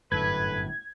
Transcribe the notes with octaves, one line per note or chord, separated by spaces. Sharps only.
G1 F#2 A2 A4 B4 G#6